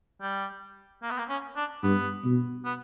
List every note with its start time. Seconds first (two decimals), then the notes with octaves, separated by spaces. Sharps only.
0.21 G3
1.02 A#3
1.11 B3
1.19 A#3
1.29 C#4
1.57 D4
1.83 G2 B3
2.24 B2
2.65 B3